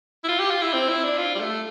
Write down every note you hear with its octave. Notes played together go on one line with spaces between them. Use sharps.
E4
F4
G4
F4
E4
C4
E4
D4
F4
G3
A3